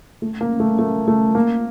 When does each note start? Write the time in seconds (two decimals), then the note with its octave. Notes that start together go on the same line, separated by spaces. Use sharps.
0.22 A3
0.41 A#3
0.60 A3
0.79 A3
1.08 A3
1.35 A#3